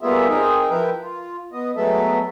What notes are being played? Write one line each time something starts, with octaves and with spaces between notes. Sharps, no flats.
G3 A#3 B3 F4 G#4 E5
C4 D#4 G#4 A#4
F3 E4 A#4 B4 G5
F4
B3 D#5
F#3 G#3 A3 B3 A4 E5